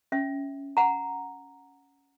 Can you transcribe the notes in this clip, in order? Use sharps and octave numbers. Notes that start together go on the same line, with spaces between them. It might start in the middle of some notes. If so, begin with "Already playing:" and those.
C#4 E5
F#5 A#5